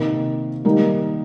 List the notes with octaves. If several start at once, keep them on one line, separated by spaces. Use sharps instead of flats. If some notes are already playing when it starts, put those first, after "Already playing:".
Already playing: C3 D#3 A#3
D#3 G3 A#3 D#4